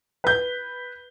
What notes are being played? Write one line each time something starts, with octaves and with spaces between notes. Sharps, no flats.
B4 G6